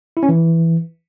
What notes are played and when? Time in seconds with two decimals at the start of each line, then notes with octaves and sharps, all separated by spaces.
0.17 E4
0.23 C#4
0.29 E3